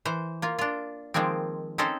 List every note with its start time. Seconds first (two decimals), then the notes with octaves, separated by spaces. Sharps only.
0.05 E3 C5
0.42 A#3 F4
0.59 D4 F4
1.14 D#3 F3 G#3 A#3 C4
1.78 C4 C#4 D#4 A4 C5